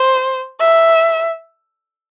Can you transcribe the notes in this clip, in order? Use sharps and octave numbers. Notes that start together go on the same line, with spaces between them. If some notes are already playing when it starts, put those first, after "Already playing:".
Already playing: C5
E5